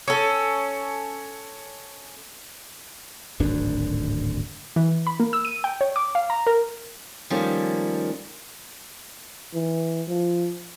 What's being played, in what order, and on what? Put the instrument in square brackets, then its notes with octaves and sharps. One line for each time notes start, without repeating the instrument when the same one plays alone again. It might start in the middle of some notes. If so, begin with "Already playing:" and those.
[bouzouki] C#4 A4
[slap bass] D1 G#1 F#2 D4
[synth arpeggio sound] E3
B5
A#3
E6
D#7
G5
C#5
D6
F5
A#5
A#4
[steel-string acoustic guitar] D#3 F3 G3 A3 A#3 C#4
[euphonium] E3
F3